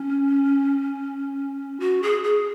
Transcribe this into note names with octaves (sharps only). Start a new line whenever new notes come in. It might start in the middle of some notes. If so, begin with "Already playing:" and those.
Already playing: C#4
F#4
G#4
G#4